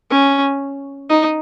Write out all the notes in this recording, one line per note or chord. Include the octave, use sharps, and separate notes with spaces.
C#4
D#4